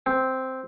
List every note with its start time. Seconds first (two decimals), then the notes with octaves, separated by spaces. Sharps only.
0.06 C4